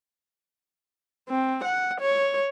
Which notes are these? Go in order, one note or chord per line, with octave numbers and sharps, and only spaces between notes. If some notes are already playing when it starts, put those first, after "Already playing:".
C4
F#5
C#5